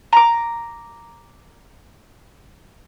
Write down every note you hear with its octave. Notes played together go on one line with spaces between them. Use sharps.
A#5 D6